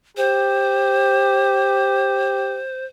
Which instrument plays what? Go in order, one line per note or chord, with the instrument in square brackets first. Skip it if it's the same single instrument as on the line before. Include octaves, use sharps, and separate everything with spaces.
[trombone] G4 [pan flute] C5